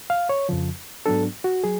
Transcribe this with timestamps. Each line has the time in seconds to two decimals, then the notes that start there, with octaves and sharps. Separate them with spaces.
0.10 F5
0.29 C#5
0.49 F2 C#3 F3
1.06 G#2 F#3 B3 D4 A4
1.44 F#4
1.64 F#3 G#4